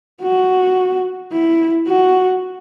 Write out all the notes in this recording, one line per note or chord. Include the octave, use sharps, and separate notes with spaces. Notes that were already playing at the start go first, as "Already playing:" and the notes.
F#4
E4
F#4